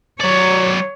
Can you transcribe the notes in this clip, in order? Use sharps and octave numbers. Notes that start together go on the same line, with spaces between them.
F#3 C#5 D5